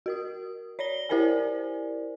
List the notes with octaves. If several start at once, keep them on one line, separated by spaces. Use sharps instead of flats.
F#4 A#4 D#6
C#5 D5 A#6 G7
E4 G4 A#4 C5 D5 G#5